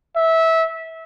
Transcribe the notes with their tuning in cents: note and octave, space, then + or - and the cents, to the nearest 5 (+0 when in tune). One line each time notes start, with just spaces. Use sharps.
E5 -20